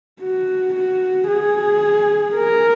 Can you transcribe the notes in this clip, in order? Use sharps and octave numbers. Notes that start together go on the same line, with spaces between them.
F#4
F#4
G#4
A#4